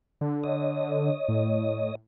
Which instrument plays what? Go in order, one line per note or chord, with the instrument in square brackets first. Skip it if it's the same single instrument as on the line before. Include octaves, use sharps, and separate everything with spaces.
[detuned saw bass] D3
[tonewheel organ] C#5 D#5 D#6
[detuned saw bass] A2